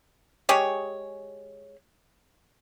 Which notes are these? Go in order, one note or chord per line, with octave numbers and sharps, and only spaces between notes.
G#3 G4 G#4 C#5